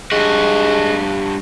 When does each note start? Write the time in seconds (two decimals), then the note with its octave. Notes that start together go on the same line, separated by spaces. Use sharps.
0.11 G2 G#3 F#4